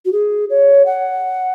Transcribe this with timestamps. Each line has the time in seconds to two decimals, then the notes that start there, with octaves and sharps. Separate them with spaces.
0.05 F#4
0.12 G#4
0.50 C#5
0.86 F#5